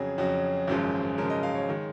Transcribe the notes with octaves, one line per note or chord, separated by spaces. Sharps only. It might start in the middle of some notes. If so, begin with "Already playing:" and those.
Already playing: F2 C#3 F#3 G#4
F2 C#3 F#3
G#1 F#2 C#3 F3 G#3
G#1 F#2 C#3 F3 G#3 A#4
D#5
F5
C#5
D#3 G#3